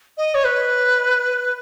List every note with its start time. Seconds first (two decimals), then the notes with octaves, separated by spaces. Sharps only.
0.17 D#5
0.34 C#5
0.44 B4